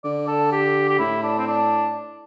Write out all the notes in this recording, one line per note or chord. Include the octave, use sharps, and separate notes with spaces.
D3 D5
A4
G4
G4
A2 E4
D4
C4
D4